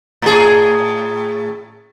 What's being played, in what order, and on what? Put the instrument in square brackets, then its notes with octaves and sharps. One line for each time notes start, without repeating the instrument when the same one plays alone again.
[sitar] A2 G#4